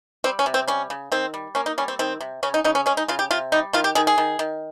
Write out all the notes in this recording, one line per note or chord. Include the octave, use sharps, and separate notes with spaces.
G3 C4
C#4
C3
C4
G3 C#4
C#3
D#3 C4
G3
A#3 C#4
D#4
G3 C#4
C4
D#3 C4
C3
C#3 C#4
D#4
C#3 D#4
C#4
G#3 C#4
D#4
C#3 F4
G4
C3 F4
G3 D#4
D#3 F4
G4
D#3 G#4
G#4
D#3
D#3